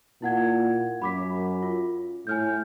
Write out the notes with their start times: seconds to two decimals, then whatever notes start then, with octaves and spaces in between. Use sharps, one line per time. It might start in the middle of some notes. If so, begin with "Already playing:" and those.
0.22 A#2 E4 F#5 G#6
1.02 F#2 B5 D6 B6
1.63 F4
2.27 A2 G#5 F6 G6